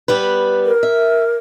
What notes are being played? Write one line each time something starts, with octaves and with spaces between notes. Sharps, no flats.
G3 B3 B4
A#4
E5